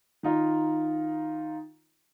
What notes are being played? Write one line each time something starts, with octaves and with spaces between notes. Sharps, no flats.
D#3 D#4 F4